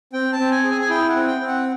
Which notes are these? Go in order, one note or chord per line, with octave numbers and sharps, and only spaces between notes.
C4 G5
A5
C4
G#5
G#4
G#5
G#5
E4 G5
F#5
C4
G5
C4
F#5